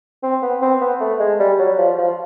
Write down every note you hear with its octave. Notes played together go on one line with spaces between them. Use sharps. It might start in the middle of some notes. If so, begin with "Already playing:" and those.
C4
B3
C4
B3
A3
G#3
G3
F#3
F3
F3